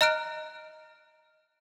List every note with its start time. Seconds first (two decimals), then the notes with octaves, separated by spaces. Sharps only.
0.01 D#5 A#5 F6 F#6 D7